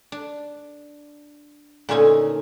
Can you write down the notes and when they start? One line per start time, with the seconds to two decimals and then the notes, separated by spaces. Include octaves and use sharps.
0.12 D4
1.89 A#2 D3 A3 C#4 D#4 G#5